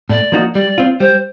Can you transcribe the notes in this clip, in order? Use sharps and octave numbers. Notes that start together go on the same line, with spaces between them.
A2 D5
F3 A#3 D#4 F#4
G3 D5
C4 F4
G3 C5